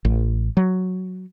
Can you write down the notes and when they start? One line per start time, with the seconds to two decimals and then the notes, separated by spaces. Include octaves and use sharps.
0.05 A1
0.57 F#3